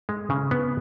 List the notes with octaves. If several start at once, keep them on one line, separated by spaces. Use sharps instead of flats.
G#3
C#3
B3